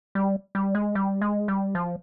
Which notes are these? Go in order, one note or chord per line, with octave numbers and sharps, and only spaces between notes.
G3
G3
G#3
G3
G#3
G3
F3